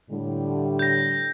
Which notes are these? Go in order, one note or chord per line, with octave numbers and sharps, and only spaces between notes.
A2 D3 G3
G6 A#6